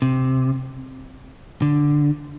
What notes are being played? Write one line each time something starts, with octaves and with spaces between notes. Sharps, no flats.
C3
D3